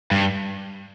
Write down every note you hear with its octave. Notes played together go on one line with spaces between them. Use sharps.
G2